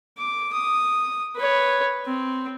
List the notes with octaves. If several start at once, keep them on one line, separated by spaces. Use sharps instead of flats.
D6
D#6
B4 C#5
C4